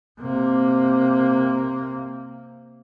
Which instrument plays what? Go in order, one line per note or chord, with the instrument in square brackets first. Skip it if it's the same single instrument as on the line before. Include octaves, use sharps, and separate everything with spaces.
[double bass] C3 A#3